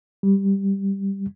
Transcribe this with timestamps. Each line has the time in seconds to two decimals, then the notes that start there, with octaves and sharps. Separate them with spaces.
0.23 G3